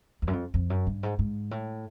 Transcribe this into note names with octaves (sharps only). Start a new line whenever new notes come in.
E2
F#2
F2
F2
F#2
G2
G#2
G#2
A2